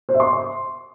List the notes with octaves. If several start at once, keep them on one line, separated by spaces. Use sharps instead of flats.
C5
E5
C6